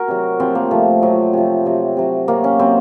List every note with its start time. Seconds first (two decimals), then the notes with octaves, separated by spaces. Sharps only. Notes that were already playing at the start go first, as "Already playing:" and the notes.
Already playing: F#4 A#4
0.08 C3 F#3
0.40 C3 F3 C4
0.55 A#3
0.71 C3 F3 A3
1.02 C3 F3 F#3
1.33 C3 F3
1.66 C3 F#3
1.97 C3 F#3
2.28 C3 F#3 A#3
2.44 C#4
2.59 C3 F#3 C4